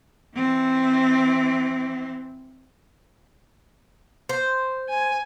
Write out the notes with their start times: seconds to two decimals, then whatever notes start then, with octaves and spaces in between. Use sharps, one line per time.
0.35 E3 C4
4.29 C5
4.89 G#5